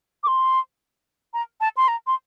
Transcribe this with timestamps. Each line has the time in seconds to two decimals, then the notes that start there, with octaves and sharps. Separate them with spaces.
0.23 D6
0.28 C6
1.34 A#5
1.61 A5
1.77 C6
1.88 A#5
2.07 C6